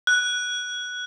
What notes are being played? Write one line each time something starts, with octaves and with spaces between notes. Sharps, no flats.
F#6